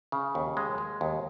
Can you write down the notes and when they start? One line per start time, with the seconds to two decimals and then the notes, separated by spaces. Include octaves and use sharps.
0.12 C#3
0.35 D#2
0.57 G#3
0.78 G#3
1.01 D#2